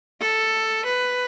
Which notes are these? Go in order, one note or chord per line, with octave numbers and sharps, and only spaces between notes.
A4
B4